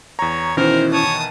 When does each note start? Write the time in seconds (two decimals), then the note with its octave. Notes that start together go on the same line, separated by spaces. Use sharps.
0.19 E2 C#5 A#5
0.57 B2 D#3 E3 C#4 E4 A#4 C5
0.93 C#5 A5 D#6